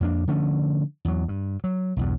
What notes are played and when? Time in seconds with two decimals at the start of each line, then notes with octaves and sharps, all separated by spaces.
0.01 F2 A#3 C#4 D4
0.28 D3 F3 A3 C#4
1.05 E2 F#3
1.28 G2
1.64 F#3
1.97 B1 E2 G2